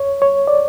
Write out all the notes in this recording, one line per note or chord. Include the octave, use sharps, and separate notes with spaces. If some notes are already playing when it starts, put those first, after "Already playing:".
Already playing: C#5
C#5
D5